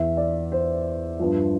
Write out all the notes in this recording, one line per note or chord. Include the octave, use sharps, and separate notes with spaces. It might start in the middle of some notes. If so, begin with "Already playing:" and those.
Already playing: E2 E3 E5
D5
C5
G2 F3